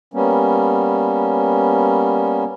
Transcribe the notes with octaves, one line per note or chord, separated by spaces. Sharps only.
G3 A#3 B3 C#4